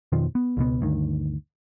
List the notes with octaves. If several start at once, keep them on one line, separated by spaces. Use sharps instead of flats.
F2 B2 D#3 F3
B3
C#2 B2 B3
G1 D2 D#3